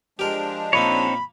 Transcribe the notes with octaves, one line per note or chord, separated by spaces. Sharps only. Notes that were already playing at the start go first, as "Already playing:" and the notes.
F3 G#3 D4 G4 A#4
A#2 A#3 C4 D#4 C#5 B5